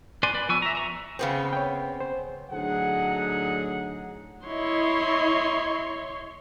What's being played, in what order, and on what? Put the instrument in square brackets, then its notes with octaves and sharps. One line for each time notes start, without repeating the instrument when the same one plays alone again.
[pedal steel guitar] B4 D5 G#5 C6
B4 D5
F3 B3 G#5 C#6 E6
E5 A#5
E5 A#5 C#6
[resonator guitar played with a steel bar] C#3 B3 C4
[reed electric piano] C#5 G5
C5
[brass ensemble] A2 D3 F#3 D#4 G#4 F#5
[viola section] E4 D#5 [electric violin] C#5 C6